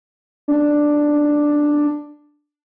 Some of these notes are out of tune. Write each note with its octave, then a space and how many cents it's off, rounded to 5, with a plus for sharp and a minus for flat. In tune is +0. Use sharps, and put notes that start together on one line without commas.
D4 +5